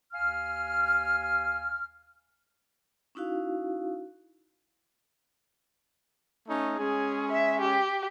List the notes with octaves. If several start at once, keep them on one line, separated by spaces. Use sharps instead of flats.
D#2 F5 G#5 F6
C#4 D#4 E4 F#4 F5
A3 C#4 D#4
G#3 C#4 G#4
E5
G4